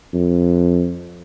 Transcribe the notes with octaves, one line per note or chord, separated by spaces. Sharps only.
F2